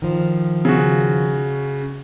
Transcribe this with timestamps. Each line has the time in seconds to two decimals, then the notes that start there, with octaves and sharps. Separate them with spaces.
0.02 D#3 F3
0.65 C#3 F#4